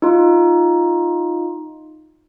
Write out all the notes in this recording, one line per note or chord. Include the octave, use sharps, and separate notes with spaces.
D#4 F4